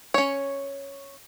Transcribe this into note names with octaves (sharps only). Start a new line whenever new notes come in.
C#4 C#5